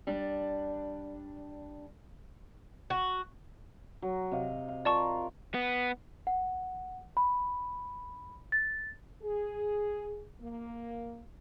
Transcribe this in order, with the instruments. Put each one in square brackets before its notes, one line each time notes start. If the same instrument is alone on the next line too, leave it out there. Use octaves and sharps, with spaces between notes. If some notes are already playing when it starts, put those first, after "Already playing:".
[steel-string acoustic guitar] G3 D4
[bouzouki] F#4
[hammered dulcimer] F#3
C3 D#5 F5
F5
[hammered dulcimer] F4 A#4 [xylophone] D5 A5 C#6
[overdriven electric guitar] B3
[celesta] F#5
B5
A6
[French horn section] G#4
A#3